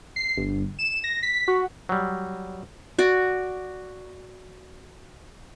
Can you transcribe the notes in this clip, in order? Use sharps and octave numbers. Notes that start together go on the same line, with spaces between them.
C7
G1
E7
A#6
B6
F#4
F#3 G3
F#4 D5